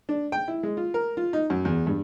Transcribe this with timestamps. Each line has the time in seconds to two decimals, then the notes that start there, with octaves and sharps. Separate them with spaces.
0.09 D4
0.32 G5
0.48 E4
0.63 G#3
0.77 F4
0.94 A#4
1.17 F4
1.33 D#4
1.50 F#2
1.65 E2
1.87 G2